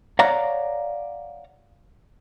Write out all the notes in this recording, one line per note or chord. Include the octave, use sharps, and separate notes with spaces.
C#5 D5 F5 F#5 A#5